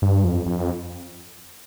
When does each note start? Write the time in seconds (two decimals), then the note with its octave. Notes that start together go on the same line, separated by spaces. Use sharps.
0.02 G2
0.24 F2
0.46 F2